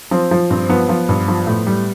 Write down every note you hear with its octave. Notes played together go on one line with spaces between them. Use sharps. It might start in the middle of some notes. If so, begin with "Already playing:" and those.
F3 C4
F3
G2 C4
F3 B3
F3
G2
F3
A2
G3